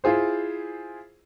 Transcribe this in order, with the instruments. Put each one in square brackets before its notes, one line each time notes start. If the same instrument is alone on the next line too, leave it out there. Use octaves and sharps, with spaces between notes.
[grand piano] E4 F4 G#4 C5